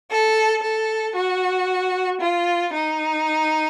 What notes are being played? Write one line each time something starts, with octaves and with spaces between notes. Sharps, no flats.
A4
A4
F#4
F4
D#4